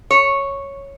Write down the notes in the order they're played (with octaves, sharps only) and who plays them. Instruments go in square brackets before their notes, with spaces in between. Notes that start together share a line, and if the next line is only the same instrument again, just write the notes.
[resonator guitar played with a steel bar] C#5